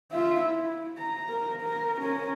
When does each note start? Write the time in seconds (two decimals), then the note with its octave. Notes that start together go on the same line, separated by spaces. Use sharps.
0.12 F4 E5
0.41 E4
0.97 A#5
1.29 A#4
1.62 A#4
2.02 C#4 A#4